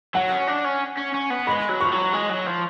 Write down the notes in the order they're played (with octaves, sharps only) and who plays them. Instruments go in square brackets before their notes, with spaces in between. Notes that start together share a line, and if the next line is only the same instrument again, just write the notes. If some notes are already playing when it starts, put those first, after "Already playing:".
[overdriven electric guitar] F#3 [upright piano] F#5
[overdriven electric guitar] C#4
D4
C#4
C#4
C#4
B3
[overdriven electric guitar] G#3 [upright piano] B5
[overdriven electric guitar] F#3
[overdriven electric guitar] F3 [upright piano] C#6
[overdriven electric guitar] F#3
G#3
F#3
F3